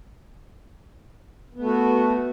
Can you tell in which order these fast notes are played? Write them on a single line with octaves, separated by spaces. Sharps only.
B3 A3 F#4